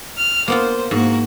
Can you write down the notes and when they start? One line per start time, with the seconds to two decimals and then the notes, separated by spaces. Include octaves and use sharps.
0.16 F6
0.48 A#3 B3 F4 C5
0.91 G#2 A#3 F#4